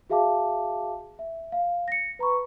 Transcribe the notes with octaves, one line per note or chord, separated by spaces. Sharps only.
F#4 G#4 E5 F5 A5 D6
E5
F5
A#6 C#7
B4 A#5 B5 C#6